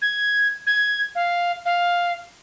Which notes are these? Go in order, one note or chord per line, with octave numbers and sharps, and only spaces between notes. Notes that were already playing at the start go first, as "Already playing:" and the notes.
G#6
G#6
F5
F5